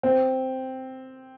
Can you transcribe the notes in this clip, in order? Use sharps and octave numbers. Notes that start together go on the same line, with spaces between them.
C4